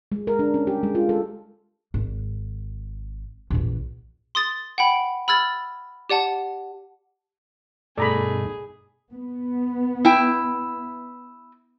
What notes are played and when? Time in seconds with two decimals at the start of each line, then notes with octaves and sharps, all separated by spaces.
0.12 G#3
0.27 A#4
0.39 D4
0.54 C#4
0.67 G4
0.83 G#3
0.95 F4
1.09 A4
1.94 G#1
3.50 A#1 E2
4.35 C6 D#6 A6
4.78 F#5 G5 B5
5.28 B5 E6 F6 G#6 A6
6.09 G4 D5 F#5 A5
7.98 G2 B2 A3 D#4 G#4 D5 A#5 B5
9.14 B3
10.05 E4 G5